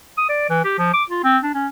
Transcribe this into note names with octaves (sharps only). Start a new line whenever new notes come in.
D#6
D5
E3
G4
F3
D6
F4
C4
D4
C#4